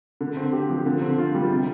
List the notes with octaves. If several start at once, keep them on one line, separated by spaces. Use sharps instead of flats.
D3
C4
G4
F3
D3
C4
F4
G3
C3